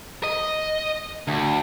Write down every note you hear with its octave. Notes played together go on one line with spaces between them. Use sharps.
D#5
D2